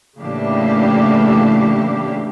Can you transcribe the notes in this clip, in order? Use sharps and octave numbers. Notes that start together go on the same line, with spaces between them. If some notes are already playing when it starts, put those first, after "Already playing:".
A2 C#3 E3 A#3 D4 G4